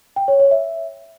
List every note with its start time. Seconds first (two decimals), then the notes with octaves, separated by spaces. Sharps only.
0.16 G5
0.28 C#5
0.40 C#5
0.51 E5